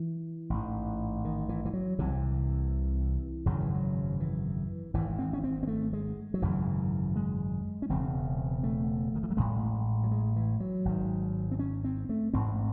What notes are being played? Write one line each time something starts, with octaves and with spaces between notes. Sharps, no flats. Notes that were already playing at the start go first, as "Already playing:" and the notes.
Already playing: E3
A1 G#2
D#3
E3
E3
F#3
C2 C3 E3
G#1 F#2 C#3 F#3
E3
F#3
E3
G#1 G#2 E3
C4
C#4
C4
C4
A3
G#3
F#3
G#1 F#2 C#3 E3
G#3
C#4
E1 E2 C#3 C4
A3
D#3
E3
F#3
A1 A2 G#3
F#3
G#3
E3
F#3
G#1 G#2
C4
C#4
C4
A3
A1 G#2 C4